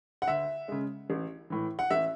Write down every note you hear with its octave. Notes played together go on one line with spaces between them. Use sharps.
F#5
D2 E5
C#3 G#3
A1
A2 E3
F#5
A1 E5